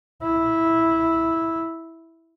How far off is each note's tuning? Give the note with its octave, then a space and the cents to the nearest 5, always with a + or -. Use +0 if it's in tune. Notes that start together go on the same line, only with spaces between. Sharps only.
E4 -10